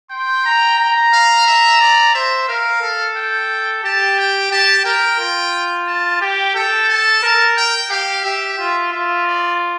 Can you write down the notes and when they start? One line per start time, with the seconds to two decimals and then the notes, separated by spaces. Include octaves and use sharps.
0.11 G5 C6
0.45 A#5
0.79 A#5
1.12 F5
1.47 E5
1.80 D5
2.14 C5 E5
2.48 A#4 F5
2.82 A4
3.16 G5
3.84 G4 A5
4.18 G5
4.51 G4 A5
4.85 A#4 G5
5.20 F4
5.87 A5
6.21 G4 G5
6.55 A4 G5
6.89 A5
7.23 A#4
7.57 G5
7.90 G4 F5
8.24 G4 E5
8.58 F4
8.92 F4 E5
9.26 D5